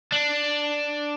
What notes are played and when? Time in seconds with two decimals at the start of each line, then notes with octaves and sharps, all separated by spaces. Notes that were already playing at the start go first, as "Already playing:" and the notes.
0.12 D4